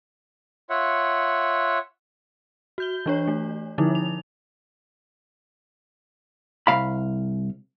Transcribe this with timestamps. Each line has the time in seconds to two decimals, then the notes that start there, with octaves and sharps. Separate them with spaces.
0.70 F4 C#5 E5 F#5
2.78 F#4 G6 G7
3.06 E3 D4 C#5
3.28 A3
3.78 D3 F3 D#4 E4
3.95 F7
6.67 C2 F5 B5